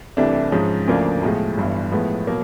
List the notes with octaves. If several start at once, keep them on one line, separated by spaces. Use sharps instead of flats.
C2 C3 E3 A3 D4
G#2 F3 G#3 C#4
D2 C#3 F3 A#3 D4
B1 A2 F3 G#3
G1 G2 E3
A2 F3 G#3 B3
B2 F#3 A#3